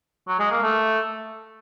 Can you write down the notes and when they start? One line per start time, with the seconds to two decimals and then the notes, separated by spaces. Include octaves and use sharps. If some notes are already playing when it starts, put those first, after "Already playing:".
0.28 F#3
0.39 G#3
0.51 A#3
0.62 A3